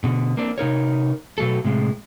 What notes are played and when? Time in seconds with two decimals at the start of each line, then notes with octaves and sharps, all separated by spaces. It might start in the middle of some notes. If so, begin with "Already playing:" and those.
0.04 B2 D3
0.37 A#3 C4 D4
0.58 C3 D#4 A#4 C#5
1.38 B2 F#3 A3 A4
1.64 A2 C3 G#3